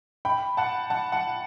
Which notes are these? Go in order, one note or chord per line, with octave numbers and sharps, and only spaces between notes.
G5 B5
F#5 A5
F#5 A5
F#5 A5